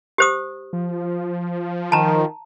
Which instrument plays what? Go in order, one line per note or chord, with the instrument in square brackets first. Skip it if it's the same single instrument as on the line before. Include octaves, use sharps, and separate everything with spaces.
[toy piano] G4 C5 D#6
[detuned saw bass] F3
[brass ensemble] D#3 [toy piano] A5 A#5